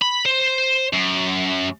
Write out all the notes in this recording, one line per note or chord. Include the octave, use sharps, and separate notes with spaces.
B5
C5
F#2